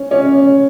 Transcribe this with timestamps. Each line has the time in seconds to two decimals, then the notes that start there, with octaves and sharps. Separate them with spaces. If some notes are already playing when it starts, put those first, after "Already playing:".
Already playing: C#4
0.11 C#4